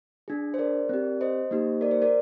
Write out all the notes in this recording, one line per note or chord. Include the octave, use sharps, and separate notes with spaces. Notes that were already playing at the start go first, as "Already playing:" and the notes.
D4 G#4
C5
A#4 D5
C4 G4
C5 D#5
A#3 D#4 G4
A#4 D5
C5
A#4 D5